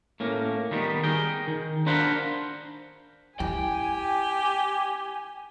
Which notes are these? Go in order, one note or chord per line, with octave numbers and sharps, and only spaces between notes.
A2 A#3 C#4
D#3 G3 B3
G#4 A#4 G5
D#3
D4 A#4 C5 F5 F#5 B5
E4 G4 G5 G#5